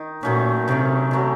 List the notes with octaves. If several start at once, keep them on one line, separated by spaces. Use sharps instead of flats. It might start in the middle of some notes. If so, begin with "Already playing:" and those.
Already playing: D#3
A#2 D#3 F#3 A3 C#4
C3 D#3 F#3 A3 C#4
D#3 F#3 A3 C#4